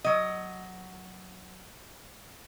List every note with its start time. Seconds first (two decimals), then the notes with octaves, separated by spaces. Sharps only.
0.04 F#3 D#5